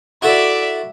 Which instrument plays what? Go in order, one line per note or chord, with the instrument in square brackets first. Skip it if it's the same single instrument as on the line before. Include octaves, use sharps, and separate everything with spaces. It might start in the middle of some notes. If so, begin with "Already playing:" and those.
[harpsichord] E4 F#4 A4 [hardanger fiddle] D5 E5